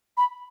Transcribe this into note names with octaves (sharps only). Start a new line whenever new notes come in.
B5